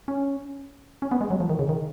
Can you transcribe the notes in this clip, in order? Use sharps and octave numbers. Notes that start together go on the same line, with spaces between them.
C#4
C#4
B3
G#3
F#3
F3
D#3
C#3
D#3